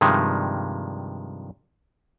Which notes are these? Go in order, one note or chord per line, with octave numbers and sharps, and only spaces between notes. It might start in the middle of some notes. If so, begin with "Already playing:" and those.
G2 C3 D#3 F3 G#3